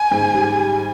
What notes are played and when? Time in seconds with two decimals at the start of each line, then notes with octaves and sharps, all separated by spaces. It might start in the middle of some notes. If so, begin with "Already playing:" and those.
Already playing: G#5
0.11 G#2
0.34 G3